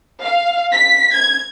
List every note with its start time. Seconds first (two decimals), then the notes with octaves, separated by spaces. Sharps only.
0.23 F5
0.74 B6
1.15 G#6